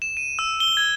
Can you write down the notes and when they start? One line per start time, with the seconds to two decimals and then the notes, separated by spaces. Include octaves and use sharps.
0.02 E7
0.17 D#7
0.39 E6
0.60 G7
0.77 G#6